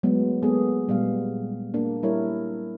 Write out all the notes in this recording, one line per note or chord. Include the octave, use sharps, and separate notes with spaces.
F#3 G#3 A3 B3
G#3 A#3 B3 G#4 A4
A#2 G3 G#3 B3 F5
A#3 D4
G3 E4 A#4 C#5